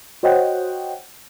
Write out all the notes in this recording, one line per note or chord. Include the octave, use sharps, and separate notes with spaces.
F#4 C5 C#5 D#5 F#5 G5